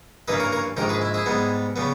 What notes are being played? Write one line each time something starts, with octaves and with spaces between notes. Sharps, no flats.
G2 E3 A#3 C#4 B4 D#5
A#4 C#5
A#4 C#5
A#1 G#2 D#3 G4 A#4
G#4 B4
E4
E4 G#4
G#2 G3 B3
C#3 G3 B3